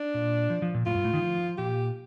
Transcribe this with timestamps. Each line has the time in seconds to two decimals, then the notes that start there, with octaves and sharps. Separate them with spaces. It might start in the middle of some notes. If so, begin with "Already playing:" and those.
Already playing: D4
0.14 A#2
0.50 F3
0.62 F3
0.74 A#2
0.86 A2 F4
0.95 G2
1.04 A2
1.14 D#3
1.22 F3
1.58 A#2 G4